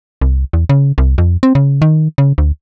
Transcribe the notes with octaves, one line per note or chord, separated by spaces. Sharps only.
C2
E2
C#3
C2
F2
C4
C#3
D#3
C#3
D2